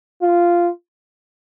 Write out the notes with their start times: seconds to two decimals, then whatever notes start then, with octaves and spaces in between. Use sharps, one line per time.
0.22 F4